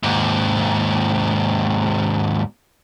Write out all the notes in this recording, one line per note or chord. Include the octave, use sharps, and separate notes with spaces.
D#2 G#2